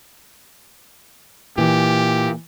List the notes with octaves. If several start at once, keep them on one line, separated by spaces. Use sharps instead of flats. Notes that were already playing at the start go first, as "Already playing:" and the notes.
A#2 E3 G4